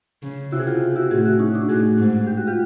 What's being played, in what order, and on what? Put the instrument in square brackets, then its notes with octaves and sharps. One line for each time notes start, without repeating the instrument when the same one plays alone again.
[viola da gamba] C#3
[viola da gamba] C3 [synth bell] E4 F#4
[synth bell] G#4
F4 G4
E4 F#4
[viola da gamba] A2 [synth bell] F#4 G#4
[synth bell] E4 F#4
C#4 D#4
D4 E4
[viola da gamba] A2 [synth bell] F#4 G#4
[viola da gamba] G#2
[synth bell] G4
F#4
F4 G4